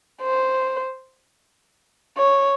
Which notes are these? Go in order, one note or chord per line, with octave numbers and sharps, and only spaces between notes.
C5
C#5